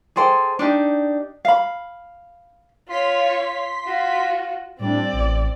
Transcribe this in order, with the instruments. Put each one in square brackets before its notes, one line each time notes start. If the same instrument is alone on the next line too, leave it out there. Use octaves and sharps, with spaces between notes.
[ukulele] G#4 A4 C5 G5
D4 D#4 G4
F5 B5
[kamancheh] F4 C#5 [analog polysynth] C6 B6
[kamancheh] F4 F#4
[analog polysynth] A2 G3 D4 [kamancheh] C4 D5
[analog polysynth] A1